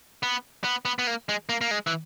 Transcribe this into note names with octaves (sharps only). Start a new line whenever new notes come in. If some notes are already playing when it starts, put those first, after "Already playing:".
B3
B3
B3
B3
A#3
G#3
A#3
A#3
G#3
E3